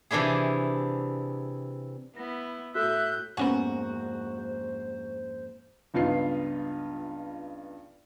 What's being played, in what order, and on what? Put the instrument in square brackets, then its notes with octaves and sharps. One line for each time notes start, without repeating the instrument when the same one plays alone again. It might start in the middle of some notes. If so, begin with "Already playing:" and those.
[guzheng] C3 E3 D4 E4 G#4
[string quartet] B3 E4 [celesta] A#6
[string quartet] A2 G6 [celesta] F#4 A4 [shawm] E5 [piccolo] F#6
[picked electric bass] F2 G#2 A#3 [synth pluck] B3 C#4 G#5 [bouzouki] F#4 [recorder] C5
[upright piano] C#2 G2 B3 D#4 F4 C7